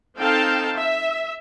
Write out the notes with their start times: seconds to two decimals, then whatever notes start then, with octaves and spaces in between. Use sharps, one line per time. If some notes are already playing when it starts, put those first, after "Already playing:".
0.18 C4 D#4 A4 F5 G5 A5
0.77 E5